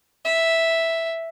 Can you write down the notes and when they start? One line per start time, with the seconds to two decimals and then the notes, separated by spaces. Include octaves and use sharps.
0.25 E5